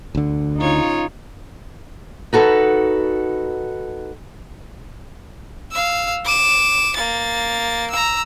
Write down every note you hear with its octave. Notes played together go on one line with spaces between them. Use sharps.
D2 D3
C#3 D#4 F4 C#5
D#4 F#4 A4 B4
F5 E6
D6 E7
A#3 A6
A#5 E6